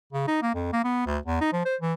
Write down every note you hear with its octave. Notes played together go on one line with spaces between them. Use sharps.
C#3
D#4
A#3
F2
A#3
B3
D2
E2
D#4
F3
C5
E3